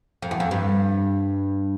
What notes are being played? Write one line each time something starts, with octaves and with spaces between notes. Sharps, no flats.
F2
E2
F2
G2